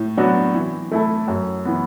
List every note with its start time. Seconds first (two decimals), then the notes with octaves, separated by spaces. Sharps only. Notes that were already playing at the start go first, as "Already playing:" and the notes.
Already playing: A2
0.17 F#3 B3 D4 F#4
0.54 E3
0.91 A3 E4 A4
1.28 F#2
1.65 E3 B3